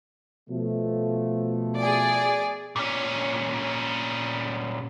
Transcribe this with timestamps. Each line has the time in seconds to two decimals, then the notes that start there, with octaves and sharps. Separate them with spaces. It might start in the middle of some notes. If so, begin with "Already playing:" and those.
0.50 B2 F3 A3
1.77 G#4 D5
2.76 A#2 C#4